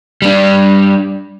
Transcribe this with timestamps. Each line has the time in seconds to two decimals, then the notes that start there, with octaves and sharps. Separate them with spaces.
0.22 G3 D4